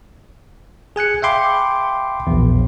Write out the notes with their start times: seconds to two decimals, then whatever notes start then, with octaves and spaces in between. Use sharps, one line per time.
0.96 G#4 G#5 F#6 C#7
1.22 E5 F5 G5 B5 C6 D6
2.27 A#1 E2